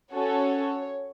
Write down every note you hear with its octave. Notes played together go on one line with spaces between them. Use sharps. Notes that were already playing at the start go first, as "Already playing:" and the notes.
C#4 F#4 A4 C#5